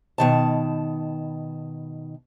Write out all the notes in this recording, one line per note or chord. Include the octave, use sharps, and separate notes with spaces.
B2 D#3 A5